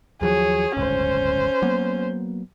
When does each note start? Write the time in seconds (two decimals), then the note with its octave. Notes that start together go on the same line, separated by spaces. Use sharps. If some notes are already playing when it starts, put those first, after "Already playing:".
0.21 D#2 F3 F#3 G#4 C#5
0.77 D1 G1 C#2 C#4 C5
1.62 F#3 A#3 B3